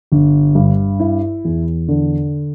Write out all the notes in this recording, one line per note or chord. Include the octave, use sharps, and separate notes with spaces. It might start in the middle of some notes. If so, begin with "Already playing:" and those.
G1
G2
E4
E2
D3